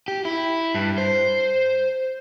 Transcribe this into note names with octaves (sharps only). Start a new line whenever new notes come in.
G4
E4
G2
C5